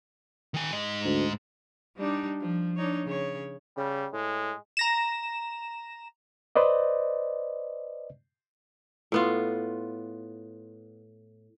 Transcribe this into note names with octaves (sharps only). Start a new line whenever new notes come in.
D#3 G#5
G#2 D#5
D2
G3 D4 D#4
F3
D4 D#4 C#5
C#3 C#5
C#3 G3
A2 G#3
A#5 A#6 E7
B4 C5 D5 D#5
A2 B3 F4